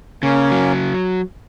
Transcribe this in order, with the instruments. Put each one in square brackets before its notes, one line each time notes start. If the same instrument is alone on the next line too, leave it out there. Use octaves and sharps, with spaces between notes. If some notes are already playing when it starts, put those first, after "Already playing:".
[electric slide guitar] C#3 [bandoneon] A#3 C#4
[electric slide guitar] F#3